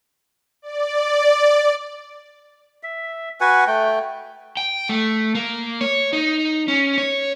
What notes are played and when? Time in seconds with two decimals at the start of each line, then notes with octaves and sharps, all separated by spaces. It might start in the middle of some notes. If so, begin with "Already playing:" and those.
0.62 D5
2.83 E5
3.41 F#4 B4 F#5 G#5
3.67 A3 G5
4.57 G5
4.89 A3
5.35 A#3
5.81 C#5
6.13 D#4
6.68 C#4
6.98 C#5